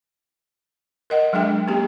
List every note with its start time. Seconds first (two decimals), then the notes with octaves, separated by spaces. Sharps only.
1.10 A#4 D#5 F#5
1.33 F#3 G#3 D4 G#4 G5
1.68 A#3 C#4 G4 G#4